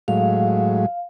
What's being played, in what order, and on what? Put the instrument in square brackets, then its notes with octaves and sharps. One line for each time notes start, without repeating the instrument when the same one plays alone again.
[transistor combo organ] A2 F#3 G#3 [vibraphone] F5